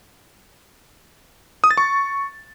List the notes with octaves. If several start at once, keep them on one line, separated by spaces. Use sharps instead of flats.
D#6
A6
C#6